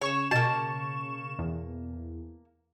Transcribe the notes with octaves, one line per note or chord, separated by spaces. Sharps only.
C#3 C#5 C#6 E7
B2 A#3 A5
E2